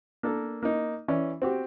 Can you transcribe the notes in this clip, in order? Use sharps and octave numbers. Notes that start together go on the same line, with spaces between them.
A#3 D4 A4 A#4
A#3 D#4
E3 C#4 D5
C4 F#4 G4